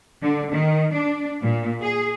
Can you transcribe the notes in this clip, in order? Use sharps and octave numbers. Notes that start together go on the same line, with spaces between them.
D3
D#3
D4
A#2
G#4